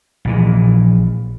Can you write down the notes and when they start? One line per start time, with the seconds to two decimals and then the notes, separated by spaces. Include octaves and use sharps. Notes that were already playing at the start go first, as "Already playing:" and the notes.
0.25 A#1 A#2 E3